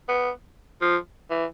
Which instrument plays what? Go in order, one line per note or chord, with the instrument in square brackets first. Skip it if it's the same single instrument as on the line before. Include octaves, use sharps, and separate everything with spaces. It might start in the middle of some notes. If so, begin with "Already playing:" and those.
[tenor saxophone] B3
F3
E3